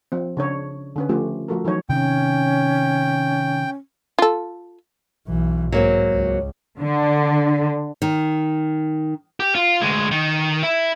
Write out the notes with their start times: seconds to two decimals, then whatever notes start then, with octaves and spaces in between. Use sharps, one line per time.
0.12 F3 C4
0.37 C#3 D4 C#5
0.96 D3 C#4 B4
1.09 F3 A3 C#4 F4 G4
1.48 F3 A3 F#4 A4 A#4
1.65 E3 F#3 D#4 C#5
1.89 C3 D#3 C#4 G5
4.19 F4 A4
5.28 B1 E3
5.72 G#2 F#3 A#3 C4
6.11 C#2
6.78 D3
8.02 D#3
9.40 G4
9.55 F4
9.82 D2 G#3
10.11 D#3
10.63 E4